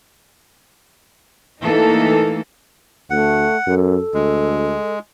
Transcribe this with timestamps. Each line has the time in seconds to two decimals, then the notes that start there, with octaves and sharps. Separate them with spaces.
1.62 E3 A3 A#3 D#4 E4 A4
3.10 D2 A3 F#5
3.67 F#2 A4
4.14 D2 G#3